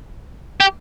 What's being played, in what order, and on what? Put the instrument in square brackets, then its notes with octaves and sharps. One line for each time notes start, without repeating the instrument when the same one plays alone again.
[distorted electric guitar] G4